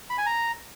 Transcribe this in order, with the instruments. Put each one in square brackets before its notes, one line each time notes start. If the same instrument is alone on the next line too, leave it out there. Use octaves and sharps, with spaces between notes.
[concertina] B5
G#5
A#5